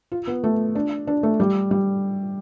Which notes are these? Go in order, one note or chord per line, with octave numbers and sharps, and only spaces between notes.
F4
B3
A3
D4
D4
A3
G3
G3